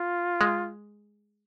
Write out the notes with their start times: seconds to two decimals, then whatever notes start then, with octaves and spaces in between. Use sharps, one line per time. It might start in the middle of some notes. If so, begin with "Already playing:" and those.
Already playing: F4
0.41 G#3